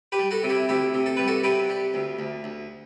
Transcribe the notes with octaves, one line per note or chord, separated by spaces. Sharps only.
G4 B4
G3
F#4 A4
C3
E4 G4
D2 E4 G4
C3
A4
G3 B4
F#4 A4
C3 G4 B4
G3
D2
D2
D2